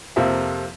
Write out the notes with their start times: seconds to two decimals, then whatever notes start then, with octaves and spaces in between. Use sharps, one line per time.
0.16 F2 C3 F3 A#3 E5